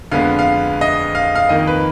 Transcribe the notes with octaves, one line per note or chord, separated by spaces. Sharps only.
F2 D3 G#3 B3 F5
F5
D#5
F5
F5
F2 D#3 A#3 D#5
B4